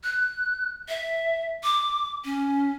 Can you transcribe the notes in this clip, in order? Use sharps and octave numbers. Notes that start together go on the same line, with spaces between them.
F#6
E5
D6
C#4